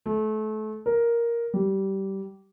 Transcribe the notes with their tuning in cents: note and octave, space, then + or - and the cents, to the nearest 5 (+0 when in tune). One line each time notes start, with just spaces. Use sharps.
A3 -30
A#4 +5
G3 -20